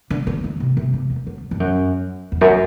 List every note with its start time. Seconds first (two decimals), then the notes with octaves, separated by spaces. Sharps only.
0.10 D3
0.27 D3
0.44 E3
0.60 C3
0.77 C3
0.93 C3
1.10 E2
1.27 F#2
1.51 G2
1.60 F#2
2.32 E2
2.41 F#2